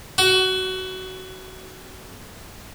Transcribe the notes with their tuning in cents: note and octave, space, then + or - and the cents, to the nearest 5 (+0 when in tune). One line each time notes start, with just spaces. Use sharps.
F#4 +20